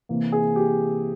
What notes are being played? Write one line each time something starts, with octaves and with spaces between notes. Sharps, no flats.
C3 E3 A#3
G#4
G4